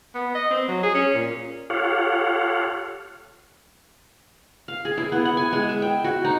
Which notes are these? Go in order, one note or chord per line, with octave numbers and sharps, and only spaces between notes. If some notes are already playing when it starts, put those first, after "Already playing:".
B3
D#5
C4
F#3
G#4
C#4
A#2
F4 G4 A4 C#5 F5 F#5
F5
G#4
E4
B3
F#5
G#5
G#3
E5
G5
F#4
D#4